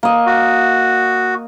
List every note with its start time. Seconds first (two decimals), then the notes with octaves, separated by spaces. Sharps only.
0.03 A#3 D#5
0.27 F#4